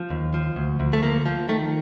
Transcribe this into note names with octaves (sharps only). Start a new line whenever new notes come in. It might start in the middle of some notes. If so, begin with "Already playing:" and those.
Already playing: F3
D#2
F3
D2
D2
A3
F3 A#3
F3
D#3 A3